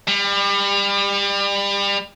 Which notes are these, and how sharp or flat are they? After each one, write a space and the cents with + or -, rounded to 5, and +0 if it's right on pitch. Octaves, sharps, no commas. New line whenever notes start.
G3 +30